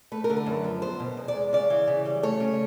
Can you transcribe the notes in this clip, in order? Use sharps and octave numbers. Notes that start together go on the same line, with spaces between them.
A3 B4
A#4
D3
B4
F#2
F3
B3 C5
B2
E2
D5
G#3
C#3 D5
E3
C#3
G3
A3 C#5
C#3